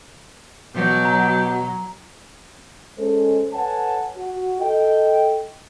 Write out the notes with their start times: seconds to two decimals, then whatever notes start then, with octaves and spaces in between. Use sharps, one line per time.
0.76 B2 F#3 G4
1.05 A#5
2.98 G#3 C#4 A4 C5
3.53 A4 B4 C#5 F#5 G#5 A5
4.17 F#4
4.60 A4 D#5 G5